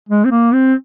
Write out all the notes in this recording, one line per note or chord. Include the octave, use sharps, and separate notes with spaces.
G#3
C4
A#3
C4